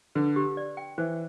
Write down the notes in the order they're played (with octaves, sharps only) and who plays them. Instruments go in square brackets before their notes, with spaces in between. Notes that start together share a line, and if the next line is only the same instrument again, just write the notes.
[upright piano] D3 [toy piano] B4
[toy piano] G4
D5
G5
[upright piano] E3 [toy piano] C5